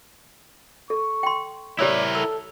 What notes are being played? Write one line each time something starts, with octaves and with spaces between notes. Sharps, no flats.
A4 C#6
G5 C6
E4 G4 A#4 C#5 D5 E6
A4 E6